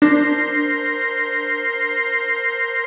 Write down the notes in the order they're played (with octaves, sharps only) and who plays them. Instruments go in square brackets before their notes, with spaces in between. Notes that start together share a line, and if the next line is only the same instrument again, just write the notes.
[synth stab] D4 [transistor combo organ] A#4 C5